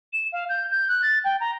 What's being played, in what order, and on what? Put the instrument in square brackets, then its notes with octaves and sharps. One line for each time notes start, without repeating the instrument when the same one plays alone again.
[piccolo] E7
F5
G6
G6
F#6
A6
G5
A#5